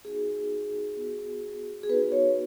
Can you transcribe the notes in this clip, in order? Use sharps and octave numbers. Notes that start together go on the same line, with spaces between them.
B3 D#4 F#4 G#4
B3 F#4
G#4
B3 D#4 F#4 B4
C#5